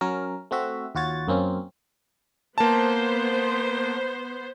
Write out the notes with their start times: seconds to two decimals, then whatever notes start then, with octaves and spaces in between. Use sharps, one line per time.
0.01 F#3 C#4 A#4
0.51 A3 C4 F#4 E5
0.95 D#2 F4 F#4 C#5 A6
1.28 F#2 A#3 C4 C#4
2.58 A#3 B3 C5 A5